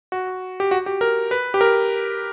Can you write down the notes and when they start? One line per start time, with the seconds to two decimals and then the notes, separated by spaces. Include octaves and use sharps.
0.12 F#4
0.60 G4
0.71 F#4
0.86 G4
1.01 A#4
1.31 B4
1.54 G4
1.61 A#4